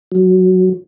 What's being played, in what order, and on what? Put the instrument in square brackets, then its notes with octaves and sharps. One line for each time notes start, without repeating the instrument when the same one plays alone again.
[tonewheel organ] F#3